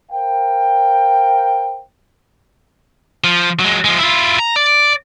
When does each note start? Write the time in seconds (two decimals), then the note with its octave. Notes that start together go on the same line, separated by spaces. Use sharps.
0.11 A#4 C5 F5 G5
3.24 F3
3.60 F#3 G#3
3.85 F3 G#3
3.99 E4 F4
4.39 A#5
4.56 D5